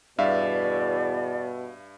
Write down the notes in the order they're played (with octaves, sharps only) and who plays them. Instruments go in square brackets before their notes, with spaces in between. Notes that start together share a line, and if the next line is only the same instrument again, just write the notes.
[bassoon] E2 [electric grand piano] G2 E5 F5 [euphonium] B2 [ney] D5